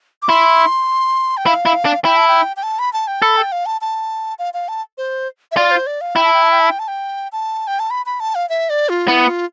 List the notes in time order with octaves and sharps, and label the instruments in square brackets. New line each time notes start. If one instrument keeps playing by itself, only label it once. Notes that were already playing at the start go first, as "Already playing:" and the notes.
[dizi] D6
[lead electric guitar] E4 [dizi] C6
[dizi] G5
[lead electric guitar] E4 [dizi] F5
[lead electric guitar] E4
D4
[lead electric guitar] E4 [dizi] G5
[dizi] A5
G5
G5
A5
B5
A5
G5
[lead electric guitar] A4 [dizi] B5
[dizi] G5
F5
A5
A5
F5
F5
A5
C5
E5
[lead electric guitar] F4 [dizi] D5
[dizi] C5
D5
F5
[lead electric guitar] E4 [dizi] G5
[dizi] A5
G5
A5
G5
A5
G5
A5
G5
A5
G5
A5
B5
B5
A5
F5
E5
D5
F4
[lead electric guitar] B3 [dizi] E4
[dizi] F4